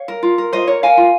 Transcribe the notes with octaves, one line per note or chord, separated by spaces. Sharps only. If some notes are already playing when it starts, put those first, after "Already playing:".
Already playing: C#5 F5
A#4
F4
A#4
F4 C5 D#5
A#4 C#5
A#4 F5 G#5
F4